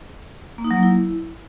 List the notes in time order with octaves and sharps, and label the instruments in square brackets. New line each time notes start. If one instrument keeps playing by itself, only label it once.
[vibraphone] A#3
D#4
F#3
A#3
E4